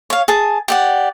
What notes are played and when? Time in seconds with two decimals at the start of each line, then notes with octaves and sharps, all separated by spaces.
0.10 C#5 F5
0.28 G#4 G#5 A5
0.68 G4 D5 F#5